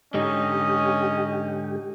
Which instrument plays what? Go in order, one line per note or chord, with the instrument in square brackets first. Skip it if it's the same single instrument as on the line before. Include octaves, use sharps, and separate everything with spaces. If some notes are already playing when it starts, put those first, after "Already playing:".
[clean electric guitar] G#2 D3 D#4 [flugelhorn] C#4 [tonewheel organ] G4 [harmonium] D#5